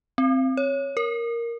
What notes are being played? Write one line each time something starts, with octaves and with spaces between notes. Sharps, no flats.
C4
C#5
A#4